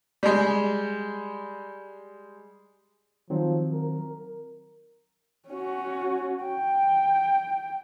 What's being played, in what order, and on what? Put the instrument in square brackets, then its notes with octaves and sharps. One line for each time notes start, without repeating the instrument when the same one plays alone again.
[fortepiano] G3 G#3
[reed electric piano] D#3 F#3 C4 [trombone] F3
[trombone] A#4
[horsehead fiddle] C#4 F#4
G5